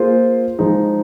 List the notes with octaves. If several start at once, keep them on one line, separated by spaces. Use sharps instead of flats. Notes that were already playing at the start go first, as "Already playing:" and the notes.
Already playing: A#3 F4 G#4 C5
F3 G#3 D#4